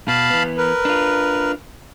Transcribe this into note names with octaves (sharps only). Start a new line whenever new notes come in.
B2 F5 A5 B5
E3 B3
A#4 B4
D4 F4